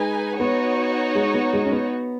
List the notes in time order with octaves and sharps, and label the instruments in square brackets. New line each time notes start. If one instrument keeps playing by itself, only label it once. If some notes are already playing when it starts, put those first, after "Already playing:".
Already playing: [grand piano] G#3 [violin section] D#4 B4 G#5
[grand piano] B3 [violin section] D#4 F#4 C#5
[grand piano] G#3
B3
G#3
C#4
B3